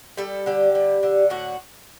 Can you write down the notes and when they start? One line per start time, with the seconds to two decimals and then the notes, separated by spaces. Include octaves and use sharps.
0.17 G3 A4
0.46 D3 G4
0.75 G3
1.03 D3
1.30 A2 F#4